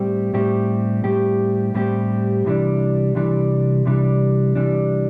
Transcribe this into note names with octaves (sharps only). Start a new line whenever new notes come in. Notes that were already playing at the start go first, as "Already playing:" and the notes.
Already playing: A2 G3 C4 G4
A2 G3 C4 G4
A2 G3 C4 G4
A2 G3 C4 G4
C2 C3 E3 G3 D4
C2 C3 E3 G3 D4
C2 C3 E3 G3 D4
C2 C3 E3 G3 D4